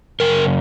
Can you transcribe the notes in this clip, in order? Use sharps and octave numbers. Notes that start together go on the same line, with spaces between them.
F#2 C#3 A#4